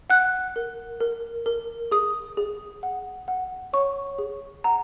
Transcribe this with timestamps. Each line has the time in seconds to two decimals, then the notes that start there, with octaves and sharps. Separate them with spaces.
0.10 F#5 F#6
0.56 A#4
1.00 A#4
1.46 A#4
1.91 G#4 D#6
2.37 G#4
2.83 F#5
3.28 F#5
3.73 C#5 C#6
4.19 G#4
4.64 F#5 A#5